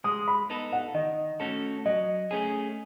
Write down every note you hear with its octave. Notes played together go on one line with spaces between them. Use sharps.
G#3 D#6
B5
B3 D#4 A4
F#5
D#3 D#5
A3 C#4 F#4 A4
F#3 D#5
A3 C#4 G#4